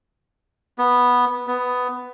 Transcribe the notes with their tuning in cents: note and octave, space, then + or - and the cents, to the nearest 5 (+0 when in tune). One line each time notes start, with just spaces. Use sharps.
B3 -5
B3 +10